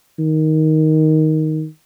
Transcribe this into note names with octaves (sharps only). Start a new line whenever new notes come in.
D#3